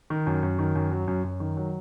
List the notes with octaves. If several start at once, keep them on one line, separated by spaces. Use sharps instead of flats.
D#3
F#2
F#2
D#3
F#2
F#3
F#2
F#2
D#3
F#3